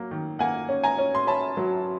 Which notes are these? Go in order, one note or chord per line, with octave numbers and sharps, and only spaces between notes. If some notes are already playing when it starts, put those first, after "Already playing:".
Already playing: F#3 A#3
D#3
A#3 F#5 G#5
C#4
G#5 A#5
C#4
C6
C#4 A5 B5
F#3